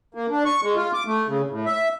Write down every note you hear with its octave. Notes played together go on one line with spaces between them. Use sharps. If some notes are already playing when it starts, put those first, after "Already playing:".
A#3
D4
C#6
G#3
F4
D6
A3
C#3
A2
E5